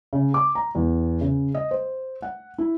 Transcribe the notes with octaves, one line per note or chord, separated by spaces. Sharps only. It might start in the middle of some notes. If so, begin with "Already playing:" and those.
C#3
D6
A#5
E2
C#3
D#5
C5
F#5
E4